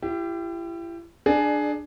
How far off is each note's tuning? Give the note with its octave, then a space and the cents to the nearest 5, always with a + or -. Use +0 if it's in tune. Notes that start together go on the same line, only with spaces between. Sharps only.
E4 +40 G4 +0
D4 +15 G#4 +15 D5 +30